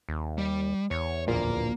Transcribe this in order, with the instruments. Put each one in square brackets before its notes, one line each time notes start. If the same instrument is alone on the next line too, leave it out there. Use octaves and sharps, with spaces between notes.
[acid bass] D#2
[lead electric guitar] G3
[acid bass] E2 [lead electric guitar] C#5
[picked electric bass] D1 A#1 A#2 [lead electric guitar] A#3